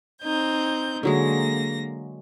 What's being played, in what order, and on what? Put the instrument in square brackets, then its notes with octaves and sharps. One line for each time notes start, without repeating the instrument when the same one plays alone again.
[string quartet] C4 D#4 G6
[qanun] D3 F#3 G#3 [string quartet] A#3 A#6